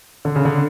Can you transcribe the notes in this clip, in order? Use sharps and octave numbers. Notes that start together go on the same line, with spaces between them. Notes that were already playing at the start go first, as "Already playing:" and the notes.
D3
C#3
D3